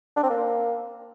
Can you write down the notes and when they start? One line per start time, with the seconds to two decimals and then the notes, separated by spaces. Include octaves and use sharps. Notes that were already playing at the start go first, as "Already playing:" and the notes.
0.17 D4
0.23 C4
0.30 A#3